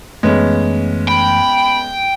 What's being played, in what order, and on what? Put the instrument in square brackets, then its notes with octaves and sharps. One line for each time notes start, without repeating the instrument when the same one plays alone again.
[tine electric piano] F#2 E3 A3 [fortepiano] G#3 B3 C#4
[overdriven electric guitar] G5 [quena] B5